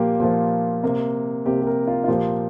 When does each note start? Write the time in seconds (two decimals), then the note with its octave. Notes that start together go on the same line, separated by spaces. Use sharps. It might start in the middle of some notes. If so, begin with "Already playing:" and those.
Already playing: A#2 F3 A#3 F4 G4
0.20 A#2 F3 A#3
0.83 C3 A#3
1.46 C3 A#3 G4
1.62 G4
1.67 A#4
1.87 F4
2.04 F4
2.08 A#2 F3 A#3 G4